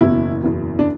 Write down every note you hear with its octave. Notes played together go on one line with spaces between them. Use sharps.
F#1 E2 B2 E4
F#1 E2 B2
D4